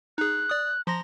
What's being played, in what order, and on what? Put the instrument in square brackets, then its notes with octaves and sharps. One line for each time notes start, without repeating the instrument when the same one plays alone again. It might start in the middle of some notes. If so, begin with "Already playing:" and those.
[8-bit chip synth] D#4 G#4 [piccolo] F#6
[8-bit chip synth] D5 D#6
[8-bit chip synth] F3 C6 A#6 [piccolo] A#5